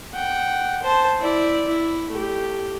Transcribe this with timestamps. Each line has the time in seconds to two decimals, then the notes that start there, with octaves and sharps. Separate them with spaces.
0.14 F#5 G5
0.83 C5 A5
1.21 E4 D5
1.68 E4
2.11 A3 G4